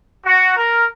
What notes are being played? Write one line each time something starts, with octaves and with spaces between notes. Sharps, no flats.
F#4
A#4